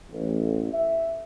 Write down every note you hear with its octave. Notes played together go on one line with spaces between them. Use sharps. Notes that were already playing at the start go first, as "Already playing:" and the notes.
A1
E5